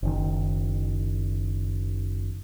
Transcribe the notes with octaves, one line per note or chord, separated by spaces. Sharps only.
F#1 D#3